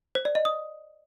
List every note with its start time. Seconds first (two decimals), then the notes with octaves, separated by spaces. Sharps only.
0.15 C5
0.25 D5
0.35 D#5
0.45 D#6